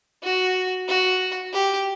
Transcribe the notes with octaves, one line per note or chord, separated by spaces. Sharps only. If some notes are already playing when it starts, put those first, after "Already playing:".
F#4
F#4
G4